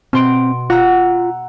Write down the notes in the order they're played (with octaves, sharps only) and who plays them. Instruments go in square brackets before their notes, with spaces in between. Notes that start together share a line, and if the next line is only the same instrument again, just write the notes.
[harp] B2 C6 D7 [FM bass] C4
[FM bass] F4 [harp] F#5 A#5 E6